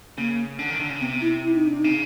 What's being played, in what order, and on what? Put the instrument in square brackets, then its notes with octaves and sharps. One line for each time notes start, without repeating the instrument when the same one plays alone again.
[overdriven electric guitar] C#3 [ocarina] A#3
[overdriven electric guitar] D3
D#3
D3
C#3
[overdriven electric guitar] C3 [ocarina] B3
[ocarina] E4
E4
D#4
D4
[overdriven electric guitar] C#3 [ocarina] D#4